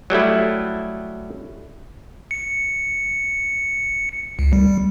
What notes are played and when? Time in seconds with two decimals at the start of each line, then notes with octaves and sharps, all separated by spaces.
0.10 F#3 G3 A3 E4
2.31 C#7
4.39 C#2
4.53 G3